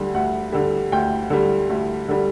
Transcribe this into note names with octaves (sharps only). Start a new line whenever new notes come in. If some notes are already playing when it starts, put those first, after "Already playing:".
Already playing: D2 D3 G3
D2 F#5
D3 G3
D2 G5
D3 G3
D2
D3 G3